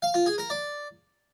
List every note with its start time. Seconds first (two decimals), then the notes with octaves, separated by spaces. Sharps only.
0.02 F5
0.14 F4
0.26 G#4
0.38 A#4
0.50 D5